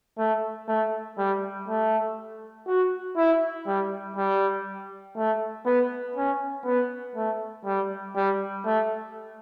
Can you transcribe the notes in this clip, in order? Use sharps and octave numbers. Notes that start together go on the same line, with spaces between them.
A3
A3
G3
A3
F#4
E4
G3
G3
A3
B3
C#4
B3
A3
G3
G3
A3